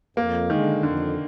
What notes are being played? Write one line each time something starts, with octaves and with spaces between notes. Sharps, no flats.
F2 A#3
D3 D#3 G#3
F2 D3